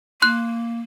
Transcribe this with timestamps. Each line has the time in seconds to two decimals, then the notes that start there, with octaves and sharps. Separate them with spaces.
0.22 A#3 C6 F#6